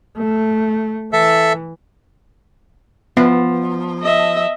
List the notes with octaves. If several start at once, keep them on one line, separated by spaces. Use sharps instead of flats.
A3
E3 A4 E5
F3 B3
D#5 E5